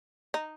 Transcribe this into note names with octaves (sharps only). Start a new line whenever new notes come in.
D#4